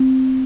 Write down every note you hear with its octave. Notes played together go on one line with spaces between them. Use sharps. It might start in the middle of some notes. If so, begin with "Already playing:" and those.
Already playing: C4